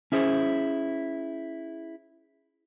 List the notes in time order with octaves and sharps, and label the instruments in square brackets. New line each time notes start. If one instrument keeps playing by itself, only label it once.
[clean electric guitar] C#4 E4 G#4 C5